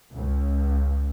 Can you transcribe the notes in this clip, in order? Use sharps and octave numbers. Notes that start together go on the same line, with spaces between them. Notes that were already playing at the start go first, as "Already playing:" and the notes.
C#2